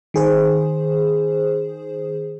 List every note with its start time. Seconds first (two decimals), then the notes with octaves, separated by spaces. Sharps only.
0.14 D#3 G#4 C5